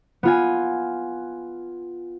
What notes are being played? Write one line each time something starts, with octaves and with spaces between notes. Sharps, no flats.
B3 F4 G#5